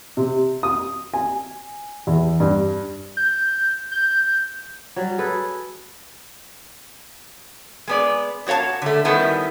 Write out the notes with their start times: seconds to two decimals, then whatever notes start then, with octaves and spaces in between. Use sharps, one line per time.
0.17 C3
0.63 D#6
1.14 G#5
2.07 E2
2.40 G2
3.17 G6
3.92 G6
4.96 F#3 G3
5.18 G#4 A4 B4
7.87 G#3 B3 D5
8.46 B3 F#4 C#5 F5 A5
8.82 D3 A3
9.05 D#3 G3 A3 B3 C#4 E4